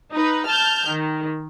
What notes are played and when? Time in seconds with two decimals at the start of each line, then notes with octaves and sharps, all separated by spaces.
0.12 D#4 B4
0.47 A5 F6 G6
0.88 D#3